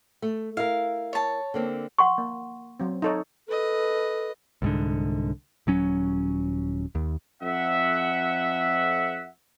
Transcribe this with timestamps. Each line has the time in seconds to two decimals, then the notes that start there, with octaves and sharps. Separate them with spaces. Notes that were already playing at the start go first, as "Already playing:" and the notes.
0.22 A3
0.57 E4 A#4 F5
1.13 C#5 A5
1.54 D3 A#3 C4
1.98 F#5 C6 C#6
2.18 A#3
2.80 F#3 C4
3.02 D#4 A4 C#5
3.48 A4 B4 D#5
4.62 C2 G#2 D3
5.67 D#1 F#3 C#4
6.95 D#2
7.43 F2 E5 F#5